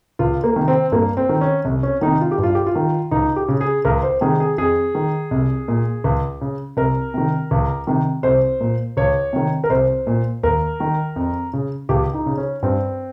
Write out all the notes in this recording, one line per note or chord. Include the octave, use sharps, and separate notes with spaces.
C#2 F4
A#3
C3 D#3
C4
G2 A#3
C4
D#3
C#4
C2
C#4
C3 D#3 D#4
F4
G4
G2
F4
G4
F4
D#3
C#2 D#4
G4
C#3
G#4
C#2 A#4
C5
C3 D#3 G#4
G#4
F2 G#4
D#3
C2
A#2
C#2
C#3
C2 A#4
C3 D#3
C#2
C3 D#3
C2 C5
A#2
C#2 C#5
C3 D#3
A#4
C2 C5
A#2
D#2 A#4
D#3
F2
C#3
C#2 G4
D#4
C#3
C#4
G2 C4